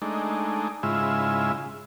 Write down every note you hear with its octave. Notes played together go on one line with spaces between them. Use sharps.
G#3 A3 D4 D#4
G#2 C#3 G#3 E4 F4 E5